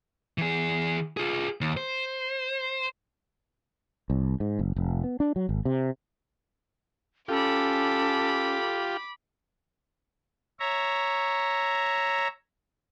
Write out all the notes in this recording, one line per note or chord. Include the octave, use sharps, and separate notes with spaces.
E3 G#4
F4 G#4
D#2
C5
C2
G#2
F#1
F1
B3
D4
F#3
G#1
C3
C#4 F4 G4 A4 B5 D6
C#5 E5 A#5